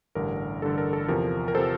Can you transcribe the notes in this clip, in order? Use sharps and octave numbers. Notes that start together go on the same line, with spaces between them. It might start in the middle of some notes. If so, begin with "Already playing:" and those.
A1 G2 D3 A#4
A1 G2 D3 A4
A#4
A4
E2 C3 F3 A#4
A#4
A4 C5
C3 F3